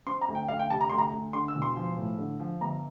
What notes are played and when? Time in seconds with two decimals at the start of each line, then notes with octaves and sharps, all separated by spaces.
0.06 C4 C6
0.21 A#5
0.28 D2
0.35 G5
0.48 D2 F5
0.59 G5
0.70 C3 A5
0.81 A#5
0.89 D2 C6
0.98 A#5
1.12 D2
1.33 D3 C6
1.48 E6
1.55 E1
1.62 C6
1.76 F3
1.98 A2
2.18 D3
2.40 F3
2.61 G1 A#5